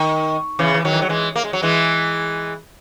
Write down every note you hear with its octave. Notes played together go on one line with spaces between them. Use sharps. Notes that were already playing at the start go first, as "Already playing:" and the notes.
Already playing: D#3
C#3 E3
E3
D#3 F#3
E3
F#3
E3 G#3
A#3
G#3
F#3
E3 G#3